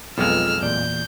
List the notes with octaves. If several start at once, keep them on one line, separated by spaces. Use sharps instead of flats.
B1 F2 G#3 B3 F4 A4 E6 F6
E2 A#2 D5 G6